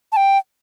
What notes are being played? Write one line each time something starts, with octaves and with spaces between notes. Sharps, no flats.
A5
G5